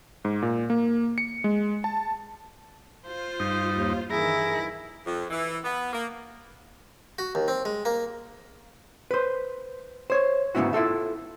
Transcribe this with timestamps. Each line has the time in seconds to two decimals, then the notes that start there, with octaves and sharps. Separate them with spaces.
0.25 G#2
0.42 A#2
0.70 A#3
1.18 C#7
1.44 G#3
1.84 A5
3.06 F4 C5
3.40 G2 D#4
3.72 D#2
4.10 G2 D#3 E3 E4 G#4 A#5
5.05 F2
5.30 E3
5.64 B3
5.92 A#3
7.19 F#4
7.35 D#2
7.48 C4
7.65 G#3
7.85 A#3
9.11 B4 C5
10.10 C5 C#5
10.55 G#2 C#3 G3 B3 E4 F#4
10.73 E4 F4 A4 E5